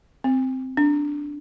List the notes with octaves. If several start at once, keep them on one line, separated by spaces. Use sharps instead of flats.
C4
D4